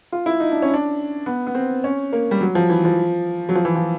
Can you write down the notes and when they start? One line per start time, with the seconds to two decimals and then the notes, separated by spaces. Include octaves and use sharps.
0.12 F4
0.26 E4
0.40 D#4
0.52 D4
0.62 C#4
0.74 D4
1.26 B3
1.47 B3
1.55 C4
1.84 C#4
2.13 A#3
2.31 G3
2.41 F#3
2.55 F3
2.69 E3
2.85 F3
3.49 F#3
3.55 F3
3.65 E3
3.75 F3